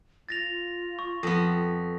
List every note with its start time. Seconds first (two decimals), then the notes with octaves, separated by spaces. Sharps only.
0.29 F4 A6 A#6 F7
0.99 C#6
1.23 F2 B3 A#6